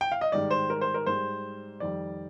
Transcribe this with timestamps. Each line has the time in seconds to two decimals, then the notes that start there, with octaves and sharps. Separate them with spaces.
0.01 G5
0.12 F5
0.21 D#5
0.32 G#2 D#3 G3 D5
0.51 C5
0.70 A#4
0.81 C5
0.94 A#4
1.06 G#2 G3 C5
1.80 F2 D#3 G3 D5